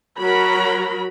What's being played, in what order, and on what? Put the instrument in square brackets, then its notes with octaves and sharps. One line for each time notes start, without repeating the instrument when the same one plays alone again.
[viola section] F#3 F#4 A#4 B5